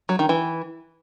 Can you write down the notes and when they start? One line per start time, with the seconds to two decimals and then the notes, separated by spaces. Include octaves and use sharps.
0.09 F#3
0.19 D#3
0.29 E3